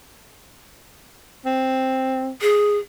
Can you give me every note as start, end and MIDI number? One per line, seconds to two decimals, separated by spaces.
1.45 2.31 60
2.41 2.78 68